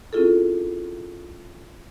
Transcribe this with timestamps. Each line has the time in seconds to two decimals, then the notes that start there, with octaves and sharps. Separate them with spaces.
0.13 C4 C#4 E4 F4 G#4 A4